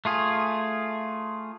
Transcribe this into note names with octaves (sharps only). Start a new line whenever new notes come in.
A3 F4 G#4